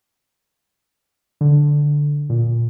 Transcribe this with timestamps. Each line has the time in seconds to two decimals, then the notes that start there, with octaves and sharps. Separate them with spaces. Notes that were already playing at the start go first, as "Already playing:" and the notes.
1.41 D3
2.30 A#2